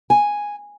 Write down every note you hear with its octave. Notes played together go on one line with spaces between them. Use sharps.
G#5